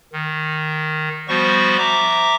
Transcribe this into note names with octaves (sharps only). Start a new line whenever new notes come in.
D#3
F3 G3 B3 F#4 C5 C#6
E5 A#5 D6